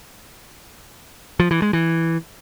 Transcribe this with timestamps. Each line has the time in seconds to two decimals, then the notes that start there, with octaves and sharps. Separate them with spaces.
1.40 F3
1.51 E3
1.62 G#3
1.73 E3